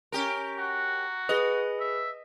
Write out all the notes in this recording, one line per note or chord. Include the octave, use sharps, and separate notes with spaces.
C#4 G4 A#4 A#5
F#4
G#4 B4 D#5
E5